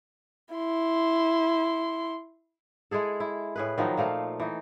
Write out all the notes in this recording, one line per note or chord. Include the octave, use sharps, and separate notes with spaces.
E4 C6
G#3 E4 G#4 A4
E4
A2 G#4 B4
D#3 F3 F#3 D#4
A#2 F3 A3 F5
E3 D#4